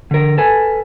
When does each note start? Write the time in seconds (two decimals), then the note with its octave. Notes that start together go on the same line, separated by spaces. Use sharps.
0.11 D3 A#4
0.38 A4 B4 G#5